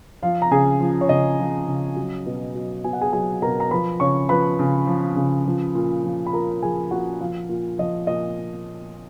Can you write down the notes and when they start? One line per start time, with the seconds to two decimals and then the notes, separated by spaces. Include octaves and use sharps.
0.23 F3 F4 F5
0.42 A#5
0.51 C#3 G#4 G#5
0.80 F3
1.01 C#5
1.09 C#3 D#5
1.39 F3
1.68 C#3
1.96 F#3
2.26 B2
2.55 F#3
2.84 B2 G#5
2.93 F#5
3.01 G#4 G#5
3.13 F#3 G#4 G#5
3.42 B2 A#4 A#5
3.60 A#5
3.71 F3 B4 B5
4.00 C#3 C#5 C#6
4.29 F3 B4 B5
4.59 C#3
4.87 F3
5.16 C#3
5.46 F3
5.75 A#2
6.04 F3
6.26 B5
6.33 A#2 A#4 A#5
6.62 F3 G#4 G#5
6.91 A#2 F#4 F#5
7.20 F3 F4 F5
7.49 A#2
7.78 F3 D#5
8.07 A#2 D#5